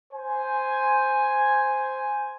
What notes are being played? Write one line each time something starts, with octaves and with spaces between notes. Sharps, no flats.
C5 G#5